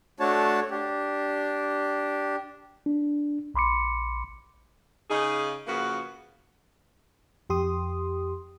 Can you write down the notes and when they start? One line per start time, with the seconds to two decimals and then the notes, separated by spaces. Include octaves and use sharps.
0.20 A3 D4 F#4 C#5 A5
0.71 D4 G4
2.86 D4
3.54 A#1 B5 C6 D6 C#7
5.10 C#3 D#4 G#4
5.67 C#3 F3 A#3 B3 F#4 B4
7.50 F2 G4 C6 D#6